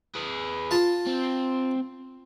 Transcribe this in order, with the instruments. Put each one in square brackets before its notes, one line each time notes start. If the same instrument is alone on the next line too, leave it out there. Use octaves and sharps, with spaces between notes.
[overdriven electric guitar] G#4 B4
[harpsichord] F4 A5
[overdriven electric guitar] C4